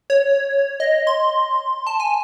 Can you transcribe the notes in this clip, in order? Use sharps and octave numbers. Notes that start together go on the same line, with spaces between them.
C#5
D#5
C6
A5
G#5